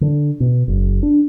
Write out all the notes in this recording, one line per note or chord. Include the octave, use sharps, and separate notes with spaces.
D3
B2
F#1
D4